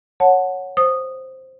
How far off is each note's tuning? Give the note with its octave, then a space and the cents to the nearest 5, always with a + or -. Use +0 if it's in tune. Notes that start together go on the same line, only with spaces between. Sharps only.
C#5 +0 F#5 -10 A5 +0
C5 +0 D#6 -10